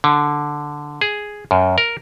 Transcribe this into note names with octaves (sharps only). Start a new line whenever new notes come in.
D3
G#4
F#2
A#4